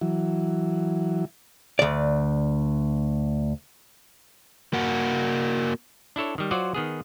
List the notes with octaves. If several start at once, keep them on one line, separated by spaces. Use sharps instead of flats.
E3 F#3
D2 D5
A#3 F#4
D4 E4 A4 C#5
D#3 G3
F#3 F4 F#4 C5 D5
D#3 B3 G#4